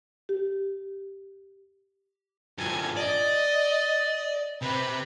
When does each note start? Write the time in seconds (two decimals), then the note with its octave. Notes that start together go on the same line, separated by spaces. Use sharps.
0.29 G4
2.58 G2 F3 G#5
2.97 D5 D#5
4.62 C3 C4 B4